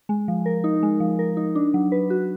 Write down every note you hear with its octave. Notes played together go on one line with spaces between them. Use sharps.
G#3
F3
A#4
D#4
G#3
F3
A#4
D#4
D4
F#3
B4
F#4